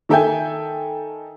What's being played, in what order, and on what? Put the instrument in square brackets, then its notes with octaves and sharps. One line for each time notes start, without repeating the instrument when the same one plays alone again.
[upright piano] D#3 A4 E5 G5 G#5 G6